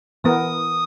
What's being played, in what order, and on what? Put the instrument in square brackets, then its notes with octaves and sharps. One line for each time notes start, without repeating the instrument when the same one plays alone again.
[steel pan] E3 B3 A#4 [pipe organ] D#6